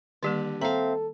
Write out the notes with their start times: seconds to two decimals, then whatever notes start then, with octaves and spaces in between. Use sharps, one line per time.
0.23 D3 D#3 G3 A#3 G4
0.62 C4 A4 E5 F5 A#5